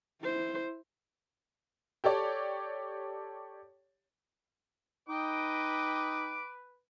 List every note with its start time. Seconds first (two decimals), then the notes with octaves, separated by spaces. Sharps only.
0.23 E4 C5
2.04 G4 A4 C#5 D5
5.09 D#4 B4 D#5 G5 D6